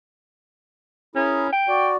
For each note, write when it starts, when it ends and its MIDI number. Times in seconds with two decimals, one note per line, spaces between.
1.16 1.52 61
1.16 1.48 64
1.16 1.48 68
1.16 1.48 70
1.53 1.89 79
1.68 1.97 66
1.68 1.97 74